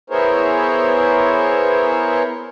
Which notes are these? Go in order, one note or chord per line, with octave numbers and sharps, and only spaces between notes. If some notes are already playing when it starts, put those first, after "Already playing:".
B3 E4 G#4 A#4 C5 C#5